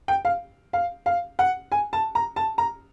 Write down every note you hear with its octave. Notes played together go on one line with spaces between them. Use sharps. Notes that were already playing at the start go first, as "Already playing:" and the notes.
G5
F5
F5
F5
F#5
G#5
A5
A#5
A5
A#5